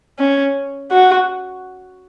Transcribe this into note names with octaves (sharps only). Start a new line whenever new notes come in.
C#4
F#4